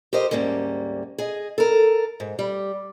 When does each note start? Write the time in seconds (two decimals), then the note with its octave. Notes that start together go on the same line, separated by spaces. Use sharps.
0.13 G4 A#4 C5 D#5
0.31 D2 G#2 G3 A#3 C#4
1.18 G#4 D#5
1.58 A4 A#4
2.20 G#2
2.39 G3